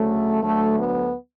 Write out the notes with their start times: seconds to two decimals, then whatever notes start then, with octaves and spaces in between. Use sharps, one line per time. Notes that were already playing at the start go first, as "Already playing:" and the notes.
Already playing: D2 C#3 F#3 A3
0.42 D2 D3 F#3 A3
0.77 B3